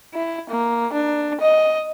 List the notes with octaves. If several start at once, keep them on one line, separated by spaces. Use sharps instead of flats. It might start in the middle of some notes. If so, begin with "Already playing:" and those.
E4
A#3
D4
D#5